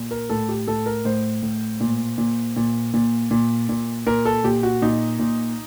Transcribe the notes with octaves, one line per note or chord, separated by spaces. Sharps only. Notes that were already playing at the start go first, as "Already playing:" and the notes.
Already playing: A#2
A#4
A2 A4
G4
A2 A4
A#4
A2 C5
A2
A#2
A#2
A#2
A#2
A#2
A#2
A#2 A#4
A4
A#2 G4
F#4
A#2 D#4
A#2